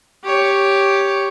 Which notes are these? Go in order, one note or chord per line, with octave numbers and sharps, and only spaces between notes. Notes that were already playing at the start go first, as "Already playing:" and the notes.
G4 C#5